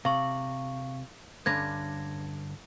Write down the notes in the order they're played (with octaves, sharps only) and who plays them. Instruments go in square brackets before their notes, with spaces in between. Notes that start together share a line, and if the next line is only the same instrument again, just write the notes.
[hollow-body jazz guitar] C3 [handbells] F5 C#6
[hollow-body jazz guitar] G2 D3 C#4 [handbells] G#6 A#6